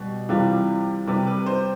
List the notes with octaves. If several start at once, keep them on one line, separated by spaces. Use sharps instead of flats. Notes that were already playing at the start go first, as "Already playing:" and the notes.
Already playing: B2 G3
C3 E3 G3 F4
C3 G3 B4
B4
C5